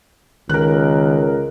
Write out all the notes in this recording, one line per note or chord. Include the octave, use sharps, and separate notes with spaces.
C#2 D#3 A#4 F#6